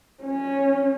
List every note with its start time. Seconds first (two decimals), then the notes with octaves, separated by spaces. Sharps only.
0.23 C#4